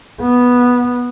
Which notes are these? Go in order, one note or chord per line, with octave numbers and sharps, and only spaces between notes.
B3